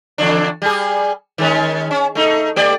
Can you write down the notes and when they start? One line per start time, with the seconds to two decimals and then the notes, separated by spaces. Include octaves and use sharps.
0.18 E2 D3 D4
0.62 G3 G#4
1.38 D#3 G#3 C#4
1.91 C#4
2.15 A3 D#4
2.56 A3 G4 D5